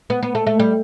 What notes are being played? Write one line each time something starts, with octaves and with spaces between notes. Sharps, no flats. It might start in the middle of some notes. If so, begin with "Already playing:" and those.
B3
B3
A3
A3
G3